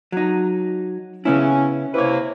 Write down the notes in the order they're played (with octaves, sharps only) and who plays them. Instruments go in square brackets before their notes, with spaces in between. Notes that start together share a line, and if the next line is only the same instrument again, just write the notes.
[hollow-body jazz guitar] F#3 D#4
[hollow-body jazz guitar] C#3 B3 E4 [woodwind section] C#4
[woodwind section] C3 A#3 E4 [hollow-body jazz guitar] B4 C#5